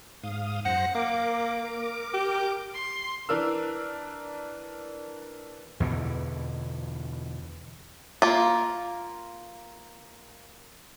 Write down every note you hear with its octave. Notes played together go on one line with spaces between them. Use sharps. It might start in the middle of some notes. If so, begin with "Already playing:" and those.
G#2 F5 D#6
F#2 C5 F#5 A#6
A#3 A#4 D6
G4
C6
E3 D4 A#4 E6
E2 B2 D3 E3
A#3 F4